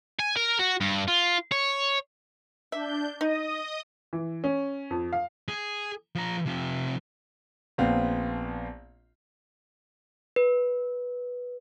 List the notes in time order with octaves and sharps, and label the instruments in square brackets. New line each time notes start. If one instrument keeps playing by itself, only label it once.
[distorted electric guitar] G#5
A#4
F#4
G2
F4
C#5
[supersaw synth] D4 G6 [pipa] E5
[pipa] D#4 [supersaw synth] D#5 D#6
[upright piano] E3
C#4
F2
F5
[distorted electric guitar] G#4
F3 A#5
C3 F3
[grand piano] A#1 B3 C4 F5
[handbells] B4